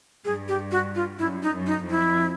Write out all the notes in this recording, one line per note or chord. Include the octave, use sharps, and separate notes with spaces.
G2 G#4
G4
F#4
F4
F#2 E4
D#4
F#2
D#4
F2
E4